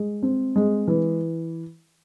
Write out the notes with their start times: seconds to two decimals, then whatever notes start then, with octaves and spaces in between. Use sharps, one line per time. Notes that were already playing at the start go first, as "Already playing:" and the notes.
Already playing: G#3
0.23 C4
0.56 G#3
0.88 E3